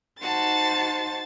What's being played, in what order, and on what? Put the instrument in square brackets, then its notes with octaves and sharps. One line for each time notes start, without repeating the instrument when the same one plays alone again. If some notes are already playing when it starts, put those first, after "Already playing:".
[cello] D#4 C5 [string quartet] F#4 A5 [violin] A6